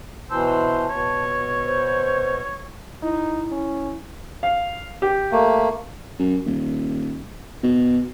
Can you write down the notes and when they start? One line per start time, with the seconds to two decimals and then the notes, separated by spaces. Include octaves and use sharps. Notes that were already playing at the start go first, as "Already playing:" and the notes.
0.31 B2 E3 C5 A5 E6
0.90 B2 C#5
1.66 C5
3.02 D#4 E4
3.51 C#4
4.43 F5
5.02 G4
5.32 A3 A#3
6.19 F#2
6.46 D#1
7.63 B2